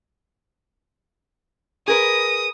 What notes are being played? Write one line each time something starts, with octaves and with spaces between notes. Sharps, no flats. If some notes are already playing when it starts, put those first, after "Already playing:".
G#4 A#4 B4 D#6